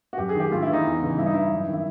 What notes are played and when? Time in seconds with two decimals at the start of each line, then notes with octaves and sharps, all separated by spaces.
0.13 F#4
0.18 F#2 G4
0.29 G#4
0.35 D#3
0.40 G4
0.51 A2 F4
0.62 E3 E4
0.73 D#4
0.85 E2
1.02 C#3 E3
1.17 G2 E4
1.26 D#4
1.34 E3 E4
1.51 F#2
1.68 D#3
1.73 E4